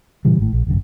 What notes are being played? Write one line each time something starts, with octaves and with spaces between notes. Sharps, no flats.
A#2 C#3 E3 G3
G#1 A2
A#1
G1 C2 F#2